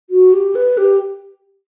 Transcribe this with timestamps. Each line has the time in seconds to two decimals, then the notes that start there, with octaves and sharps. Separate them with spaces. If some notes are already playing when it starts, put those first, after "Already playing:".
0.10 F#4
0.33 G4
0.55 B4
0.78 G4